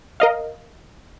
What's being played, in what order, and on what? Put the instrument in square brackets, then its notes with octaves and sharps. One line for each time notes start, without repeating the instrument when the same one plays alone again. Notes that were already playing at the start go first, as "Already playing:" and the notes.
[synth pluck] A#4 D#5 F5